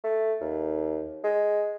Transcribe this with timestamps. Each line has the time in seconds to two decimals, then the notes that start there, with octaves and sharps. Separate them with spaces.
0.04 A3
0.41 D#2
1.24 G#3